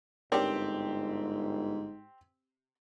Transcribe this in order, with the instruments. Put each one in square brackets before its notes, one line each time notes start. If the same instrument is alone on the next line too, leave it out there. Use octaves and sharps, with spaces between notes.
[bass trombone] G1 [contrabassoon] G#2 [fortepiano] C4 G4 [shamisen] D4 A#4 C#5